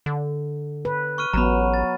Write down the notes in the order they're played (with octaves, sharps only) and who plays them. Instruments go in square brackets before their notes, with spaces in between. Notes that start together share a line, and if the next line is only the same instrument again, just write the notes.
[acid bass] D3
[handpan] B4
[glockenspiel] C#6 F6 D#7
[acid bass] A1 [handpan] F#3 B3 [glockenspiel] A#5 B5
[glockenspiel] A6